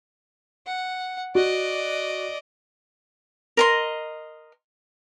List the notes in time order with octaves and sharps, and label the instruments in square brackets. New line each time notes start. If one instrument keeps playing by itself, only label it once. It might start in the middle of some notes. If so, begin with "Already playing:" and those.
[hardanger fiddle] F#5
[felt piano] F#4 [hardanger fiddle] D5 D#5
[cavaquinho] A#4 D#5 C6